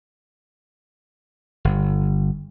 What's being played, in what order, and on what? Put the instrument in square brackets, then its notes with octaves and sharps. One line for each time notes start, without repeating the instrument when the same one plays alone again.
[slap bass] G1